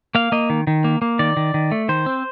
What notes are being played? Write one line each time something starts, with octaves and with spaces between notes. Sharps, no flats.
A#3 F5
A#3 D#5
D#3
D#3
A#3
A#3
D#3 D5
D#3
D#3
A3
D#3 C5
C4